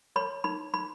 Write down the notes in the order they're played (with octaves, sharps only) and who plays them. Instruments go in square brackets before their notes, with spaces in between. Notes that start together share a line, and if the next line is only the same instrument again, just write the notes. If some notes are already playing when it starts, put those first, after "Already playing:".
[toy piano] C#5 B5
D#4 B5
D#4 B5